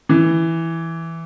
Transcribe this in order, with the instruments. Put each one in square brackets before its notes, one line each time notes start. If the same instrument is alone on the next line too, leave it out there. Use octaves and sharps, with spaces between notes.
[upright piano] E3